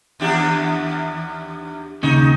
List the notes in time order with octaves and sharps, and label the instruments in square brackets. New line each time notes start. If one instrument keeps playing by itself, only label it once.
[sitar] D#2 D4 G4
[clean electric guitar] D#2 C#3 [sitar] D#4